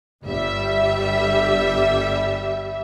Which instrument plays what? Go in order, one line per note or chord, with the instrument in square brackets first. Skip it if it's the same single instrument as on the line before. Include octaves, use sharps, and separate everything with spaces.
[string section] G1 G3 E5